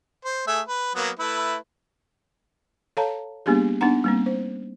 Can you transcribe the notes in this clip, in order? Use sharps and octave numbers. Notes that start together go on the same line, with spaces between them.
C5
A3 G#4 E5
B4
F#3 A#3 B3
A3 E4 B4
A4 C#5 F5 A5 A#5
G3 A#3 B3 D4 G4 G#4
B3 D4 D#4 F#5 A#5
G3 A#3 C4
C5